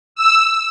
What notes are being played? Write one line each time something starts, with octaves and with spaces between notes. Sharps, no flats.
E6